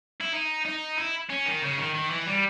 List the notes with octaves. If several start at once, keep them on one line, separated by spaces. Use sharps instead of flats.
E4
D#4
D#4
E4
C#4
D#3
C#3
D#3
D#3
E3
G3